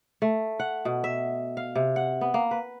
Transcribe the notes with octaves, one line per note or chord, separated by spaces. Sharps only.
A3
F#5
B2
E5
F5
C3
F#5
B3
A#3
B4